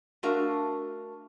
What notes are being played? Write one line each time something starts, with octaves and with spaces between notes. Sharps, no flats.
A3 D4 F#4 A#4 F5